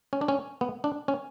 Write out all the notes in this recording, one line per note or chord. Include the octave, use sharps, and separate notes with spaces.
C#4
D4
C#4
B3
D4
C#4